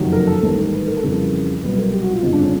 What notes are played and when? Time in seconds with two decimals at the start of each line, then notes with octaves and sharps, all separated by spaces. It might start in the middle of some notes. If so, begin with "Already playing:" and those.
Already playing: F#1 F2 C3 D#3 F#3
0.13 A#4
0.27 A4
0.42 A1 G#2 D#3 G3 A#4
0.58 A#4
0.72 B4
0.88 A#4
0.97 A4
1.02 F2 C#3 E3 G3 A#4
1.62 C2 B2 F#3 B4
1.78 A#4
1.92 G4
2.03 F#4
2.13 F4
2.23 G1 F2 C#3 F3 D#4
2.33 D4
2.43 C#4